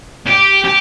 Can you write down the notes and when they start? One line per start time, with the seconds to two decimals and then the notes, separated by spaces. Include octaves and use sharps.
0.27 G4
0.65 G4